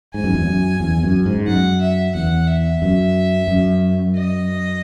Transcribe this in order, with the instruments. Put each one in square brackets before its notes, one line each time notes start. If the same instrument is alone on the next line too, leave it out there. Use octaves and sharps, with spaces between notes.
[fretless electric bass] G#2 [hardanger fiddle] G#5
[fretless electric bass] F#2
E2
F#2
E2
F#2
G#2
[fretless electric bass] F#2 [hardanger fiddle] F#5
[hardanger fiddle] E5
[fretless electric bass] E2 [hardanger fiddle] F#5
[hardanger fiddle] E5
[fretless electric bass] F#2
F#2
[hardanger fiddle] D#5